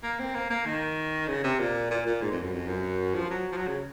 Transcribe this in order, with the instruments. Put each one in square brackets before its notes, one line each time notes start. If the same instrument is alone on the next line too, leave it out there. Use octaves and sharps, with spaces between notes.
[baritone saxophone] A#3
C4
A#3
A#3
D#3
C#3
C3
A#2
A#2
A#2
G#2
F2
F#2
F2
F#2
F3
F#3
F3
F#3
C#3